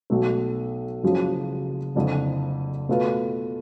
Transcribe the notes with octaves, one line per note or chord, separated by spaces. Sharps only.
B1 B2 A3
F#1 F#2 C#3 F3
F#1 F2 D3 F3
B2 A3 F4 B4